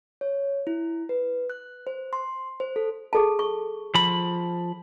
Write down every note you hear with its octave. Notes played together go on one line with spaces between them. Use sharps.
C#5
E4
B4
F#6
C5
C6
C5
A4
G#4 A4 A5
C#6
F3 B5